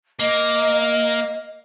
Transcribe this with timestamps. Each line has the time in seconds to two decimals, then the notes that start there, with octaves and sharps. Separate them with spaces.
0.20 A#3 D#5